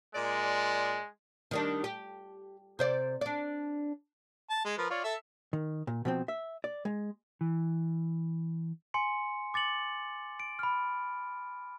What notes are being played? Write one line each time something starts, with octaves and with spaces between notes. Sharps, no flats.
A#2 G#3 D5
D#3 G3 D4
G4
C3 C5 D5
D4 D5
A5
G#3
F3 A#4 B4
F4 C#5 D5
A4 E5
D#3
A#2
B2 F3 C4
E5
D5
G#3
E3
G#5 C6 C#7
D6 A6 C#7 F#7
D7
B5 F6